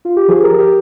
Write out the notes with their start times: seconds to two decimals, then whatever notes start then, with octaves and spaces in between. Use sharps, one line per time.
0.05 F4
0.17 G4
0.28 F3 F4 G#4
0.43 G4 A#4
0.51 F3
0.59 G4 A#4